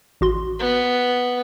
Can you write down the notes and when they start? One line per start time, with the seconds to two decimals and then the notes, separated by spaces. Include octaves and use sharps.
0.21 A1 F#4 C6
0.59 B3